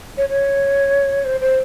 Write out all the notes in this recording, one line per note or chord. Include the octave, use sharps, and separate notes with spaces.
C#5
C#5
C5
C5